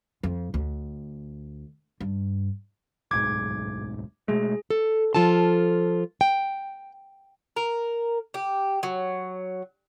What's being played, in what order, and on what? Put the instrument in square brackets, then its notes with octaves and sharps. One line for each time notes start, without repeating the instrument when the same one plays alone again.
[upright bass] F2
D2
G2
[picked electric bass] D1 B1 G#2 [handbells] D6 G#6
[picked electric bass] B2 G#3 A3 [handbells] G#4
[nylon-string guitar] A4
F3 F4 A4 A5
G5
[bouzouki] A#4
G4
F#3